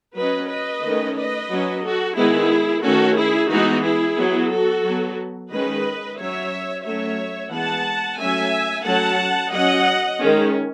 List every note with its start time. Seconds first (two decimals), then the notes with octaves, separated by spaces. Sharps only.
0.16 F#3 C#4 B4 D#5
0.50 B4 D#5
0.84 D#3 A3 C#4
1.17 B4 D#5
1.51 F#3 C#4
1.84 F#4 A4
2.17 D#3 G#3 B3 E4 G#4
2.84 D#3 A3 C#4 F#4 A4
3.18 E4 G#4
3.51 E3 G#3 B3 D#4 F#4
3.85 E4 G#4
4.18 F#3 B3
4.52 F#4 A4
4.85 F#3 B3
5.51 D#3 G#3 C#4 B4 D#5
6.19 F#3 C#4 C#5 E5
6.86 F#3 A3 C#4 C#5 E5
7.52 E3 G#3 B3 F#5 A5
8.19 F#3 A3 C#4 E5 G#5
8.86 F#3 A3 C#4 F#5 A5
9.53 F#3 C#4 D#5 F#5
10.20 D#3 G#3 C#4